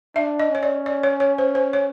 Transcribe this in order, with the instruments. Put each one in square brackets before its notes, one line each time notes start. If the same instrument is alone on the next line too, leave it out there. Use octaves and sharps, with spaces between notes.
[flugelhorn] D4 [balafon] E5
[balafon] D#5
[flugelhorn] C#4 [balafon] C#5
[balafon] D5
D5
C#5
C#5
C5
C5
C#5